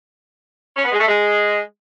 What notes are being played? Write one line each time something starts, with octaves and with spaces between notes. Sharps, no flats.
C#4
B3
G#3
A3
G#3